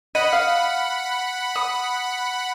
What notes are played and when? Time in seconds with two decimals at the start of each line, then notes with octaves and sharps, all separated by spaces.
0.15 D#5 F#5 B5
0.33 F5
1.56 D#6